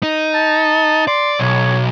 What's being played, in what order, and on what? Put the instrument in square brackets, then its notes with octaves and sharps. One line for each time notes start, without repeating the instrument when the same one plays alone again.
[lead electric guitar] D#4
[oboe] A5
[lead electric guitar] D5 [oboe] C6
[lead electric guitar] B1 [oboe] C#5